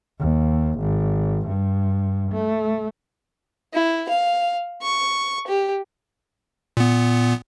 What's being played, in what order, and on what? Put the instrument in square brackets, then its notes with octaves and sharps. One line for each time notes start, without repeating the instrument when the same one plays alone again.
[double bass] D#2
G#1
G2
A3
[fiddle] E4
F5
C#6
G4
[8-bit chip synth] A#2 B3